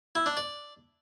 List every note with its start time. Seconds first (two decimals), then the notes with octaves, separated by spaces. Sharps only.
0.15 E4
0.26 D4
0.37 D5